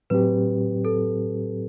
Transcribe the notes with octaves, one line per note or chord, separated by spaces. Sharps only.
A2 F#3 C4 G4 B4
A4